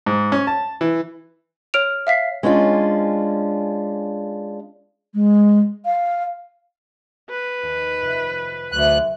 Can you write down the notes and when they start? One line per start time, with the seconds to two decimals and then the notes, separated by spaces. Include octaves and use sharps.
0.06 G#2
0.32 C#4
0.47 A5
0.81 E3
1.74 C#5 F6 D7 F7
2.07 E5 F5 B6 C7
2.43 G#3 C#4 D4 F4
5.14 G#3
5.85 F5
7.30 B4
7.63 D#2
8.01 F1 F2
8.72 D2 F#3 E5 F#6